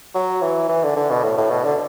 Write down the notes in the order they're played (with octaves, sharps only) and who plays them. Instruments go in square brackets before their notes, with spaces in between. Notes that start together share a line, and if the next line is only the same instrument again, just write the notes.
[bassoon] F#3
E3
E3
D3
D3
B2
A2
A2
B2
D3